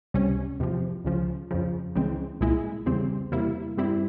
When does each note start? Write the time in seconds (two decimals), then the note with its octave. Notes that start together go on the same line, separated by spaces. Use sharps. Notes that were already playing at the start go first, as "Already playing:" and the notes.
0.14 C#2 C3 G3 C#4
0.59 E2 C3 F3
1.05 C#2 C#3 F3
1.51 F2 C#3 F3
1.95 C#2 C#3 E3 G#3 C4
2.41 C2 A#2 G#3 E4
2.86 E2 C#3 G3 C4
3.32 E2 C3 G3 A#3 E4
3.77 G2 G3 C4 E4